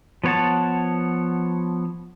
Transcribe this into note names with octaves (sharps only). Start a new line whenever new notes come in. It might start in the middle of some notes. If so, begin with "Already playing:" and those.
F3 B3 C#5 F#5 A5